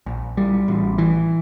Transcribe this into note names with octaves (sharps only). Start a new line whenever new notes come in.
A#1
G3
A1
E3